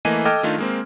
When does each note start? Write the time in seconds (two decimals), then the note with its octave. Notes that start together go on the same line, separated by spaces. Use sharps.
0.05 E3 A3 A#3 D#5 G#5 D#7
0.25 A4 D#5 G5 D6 F6 G#6
0.43 D#3 A3 D4 D#4 F4
0.58 G#3 A#3 C4